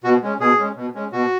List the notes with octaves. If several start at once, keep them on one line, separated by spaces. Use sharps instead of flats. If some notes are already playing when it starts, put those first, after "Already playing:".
B2 F#4
G#3 C#4
B2 G#4
G#3 C#4
B2
G#3 C#4
B2 F#4